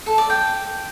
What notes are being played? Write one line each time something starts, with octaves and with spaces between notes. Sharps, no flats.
A4
D5
G5